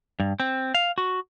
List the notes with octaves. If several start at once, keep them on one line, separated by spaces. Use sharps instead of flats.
G2
C4
F5
F#4